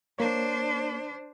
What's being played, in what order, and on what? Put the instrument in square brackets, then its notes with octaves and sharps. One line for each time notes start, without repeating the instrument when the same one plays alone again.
[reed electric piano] A#3 C#5 [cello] D4 C5